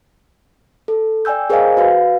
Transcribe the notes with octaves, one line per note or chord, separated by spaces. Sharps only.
A4
D5 G5 G#5 E6 G6
G#4 A#4 C5 D#5 F5 G#5
F#4 B4 F5